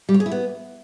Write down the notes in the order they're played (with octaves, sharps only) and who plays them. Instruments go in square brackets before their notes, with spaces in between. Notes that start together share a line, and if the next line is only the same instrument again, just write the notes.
[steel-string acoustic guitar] G3
C#5
G#4
E4
B3